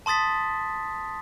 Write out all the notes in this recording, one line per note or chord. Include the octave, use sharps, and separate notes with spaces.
A5 C6 D#6 A6 B6